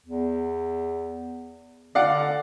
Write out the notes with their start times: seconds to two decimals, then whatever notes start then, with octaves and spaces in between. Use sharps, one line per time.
0.06 E2
1.95 D3 D5 F5 F#5